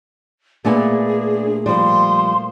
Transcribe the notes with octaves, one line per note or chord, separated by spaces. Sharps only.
A#2 A3 B3 D4 G#4 G#5
F3 G3 C6